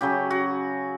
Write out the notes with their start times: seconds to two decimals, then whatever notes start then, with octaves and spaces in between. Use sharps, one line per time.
0.01 C#3 F#3 G4
0.30 F#4